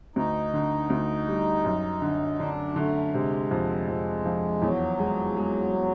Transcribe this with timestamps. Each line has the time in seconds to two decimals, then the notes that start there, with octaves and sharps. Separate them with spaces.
0.16 D2 D#4
0.53 D3
0.90 D2
1.28 G3
1.65 F#2
2.02 D3
2.39 D3 D4
2.76 D3 A3
3.13 C3 G#3
3.51 F2
3.88 F2
4.25 F3
4.62 E2 F#3
4.99 G#3
5.37 G#3
5.73 G#3